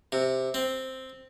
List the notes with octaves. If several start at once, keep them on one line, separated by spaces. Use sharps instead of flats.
C3
C4